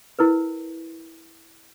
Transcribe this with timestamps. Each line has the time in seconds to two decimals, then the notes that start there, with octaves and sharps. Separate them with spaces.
0.19 E4 A#4 B4